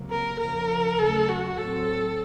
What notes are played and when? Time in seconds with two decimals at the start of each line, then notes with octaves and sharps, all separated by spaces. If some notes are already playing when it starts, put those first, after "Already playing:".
Already playing: C#2 C3 F#3 A#3
0.10 A#4
0.40 F2 C#3 F3 A#4
0.99 D#2 C#3 F#3 A3 A4
1.29 F#4
1.58 A2 F#3 C4 A4